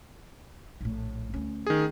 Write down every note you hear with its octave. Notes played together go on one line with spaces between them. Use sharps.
A#1 A2
D2 C#4
D#3 G#4